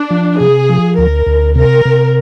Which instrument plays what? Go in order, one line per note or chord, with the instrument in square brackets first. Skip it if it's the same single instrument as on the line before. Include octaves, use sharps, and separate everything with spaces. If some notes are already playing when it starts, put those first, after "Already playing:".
Already playing: [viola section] D4
[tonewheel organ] F3
[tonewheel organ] C3 [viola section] G#4
[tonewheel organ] F3
[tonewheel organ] D2 [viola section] A#4
[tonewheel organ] D2
[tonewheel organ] C3 [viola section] A#4
[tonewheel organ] C3